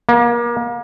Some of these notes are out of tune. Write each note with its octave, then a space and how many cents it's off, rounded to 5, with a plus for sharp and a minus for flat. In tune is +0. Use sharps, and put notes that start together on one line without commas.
A#3 +35